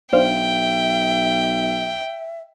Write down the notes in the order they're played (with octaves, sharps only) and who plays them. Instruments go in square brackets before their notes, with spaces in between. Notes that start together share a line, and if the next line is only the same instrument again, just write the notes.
[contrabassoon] B1 [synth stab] D4 C5 F5 [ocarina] E5 [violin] G5